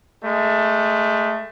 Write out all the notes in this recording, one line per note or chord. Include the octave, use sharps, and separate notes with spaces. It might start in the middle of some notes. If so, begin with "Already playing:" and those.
G#3 A3